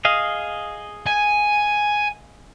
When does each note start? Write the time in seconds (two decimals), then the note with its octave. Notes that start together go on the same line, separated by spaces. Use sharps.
0.05 G#4 D#5 F5
1.06 G#5